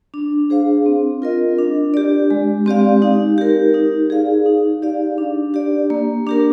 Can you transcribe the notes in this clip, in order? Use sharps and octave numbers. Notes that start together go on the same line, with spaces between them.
D4
G#4 C5 F5
C4
F4 A#4 D#5
D4
G4 D5
G#3
C4 G4 D5 F5
D#4
G4 A#4
D#4
G#4 D5 F5
D#4
G4 D5 F5
D4
G4 D5
A#3
D4 G4 A#4